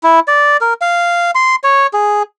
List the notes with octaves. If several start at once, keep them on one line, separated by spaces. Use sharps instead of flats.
E4
D5
A#4
F5
C6
C#5
G#4